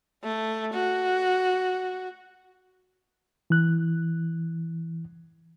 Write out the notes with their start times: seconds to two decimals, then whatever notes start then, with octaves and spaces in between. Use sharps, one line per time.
0.24 A3
0.73 F#4
3.50 E3 F#6